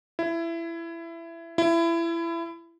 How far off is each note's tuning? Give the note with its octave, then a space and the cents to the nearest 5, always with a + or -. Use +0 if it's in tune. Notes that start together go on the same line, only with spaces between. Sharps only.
E4 +20
E4 +25